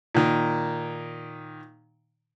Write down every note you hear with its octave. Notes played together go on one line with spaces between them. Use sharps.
A#2 D#3